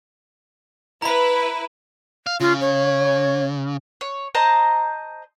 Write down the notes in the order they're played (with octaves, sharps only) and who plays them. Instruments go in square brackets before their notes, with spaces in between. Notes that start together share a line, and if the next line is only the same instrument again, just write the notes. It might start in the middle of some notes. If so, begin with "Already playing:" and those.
[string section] E4 B4 [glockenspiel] A#5 B5
[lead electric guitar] F5
[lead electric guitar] C#3 [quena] F4
[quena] C#5
[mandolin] C#5
C5 D#5 A5 A#5